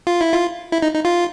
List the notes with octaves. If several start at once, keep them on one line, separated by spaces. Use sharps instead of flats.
F4
E4
F4
E4
D#4
D#4
F4